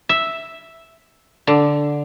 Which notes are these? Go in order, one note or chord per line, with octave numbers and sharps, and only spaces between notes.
E5
D3